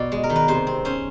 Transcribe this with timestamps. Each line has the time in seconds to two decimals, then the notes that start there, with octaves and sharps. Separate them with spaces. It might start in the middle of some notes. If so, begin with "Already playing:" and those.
Already playing: B2 D5
0.12 G#3
0.23 A#4
0.30 D#3
0.36 B4
0.48 C3 C5
0.67 C4
0.85 C#4 C5